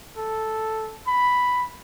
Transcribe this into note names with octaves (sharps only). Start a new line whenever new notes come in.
A4
B5